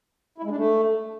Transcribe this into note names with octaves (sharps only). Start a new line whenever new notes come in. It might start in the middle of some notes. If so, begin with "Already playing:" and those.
E4
G#3
D4
A3